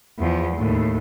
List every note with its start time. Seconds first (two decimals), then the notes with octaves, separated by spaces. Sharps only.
0.19 E2 F3
0.56 D#2 A2